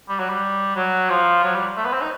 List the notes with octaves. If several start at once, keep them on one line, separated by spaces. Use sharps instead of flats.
G3
F#3
G3
F#3
F3
F#3
G3
A3
B3
C4
D#4